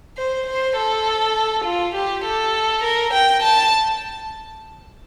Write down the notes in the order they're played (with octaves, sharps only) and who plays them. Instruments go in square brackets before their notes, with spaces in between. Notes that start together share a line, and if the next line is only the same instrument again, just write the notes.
[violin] C5
C5
A4
F4
G4
A4
A#4
G5
A5